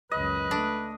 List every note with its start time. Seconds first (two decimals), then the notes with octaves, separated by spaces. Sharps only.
0.11 C#2 F#2 B4 D#5
0.51 A3 D4